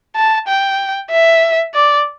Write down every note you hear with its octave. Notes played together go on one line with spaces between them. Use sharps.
A5
G5
E5
D5